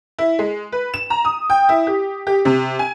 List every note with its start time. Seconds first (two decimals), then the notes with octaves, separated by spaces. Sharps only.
0.19 E4
0.39 G#3
0.72 B4
0.94 E7
1.10 A#5
1.25 D#6
1.50 G5
1.69 E4
1.87 G4
2.27 G4
2.45 C3
2.79 G#5